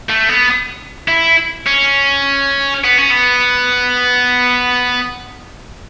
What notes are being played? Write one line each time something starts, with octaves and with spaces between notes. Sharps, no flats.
A3
B3
E4
C#4
B3
C#4
B3